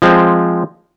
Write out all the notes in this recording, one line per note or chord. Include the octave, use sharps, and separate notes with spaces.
F3 G#3 C4